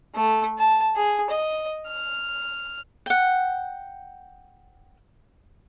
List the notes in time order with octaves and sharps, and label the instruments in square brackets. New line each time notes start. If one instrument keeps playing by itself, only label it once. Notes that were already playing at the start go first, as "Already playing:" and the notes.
[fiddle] A3
A5
G#4
D#5
F6
[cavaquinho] F#5 G5